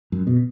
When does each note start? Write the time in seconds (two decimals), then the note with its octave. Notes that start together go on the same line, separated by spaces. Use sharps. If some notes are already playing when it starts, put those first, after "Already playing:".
0.12 F#2
0.27 B2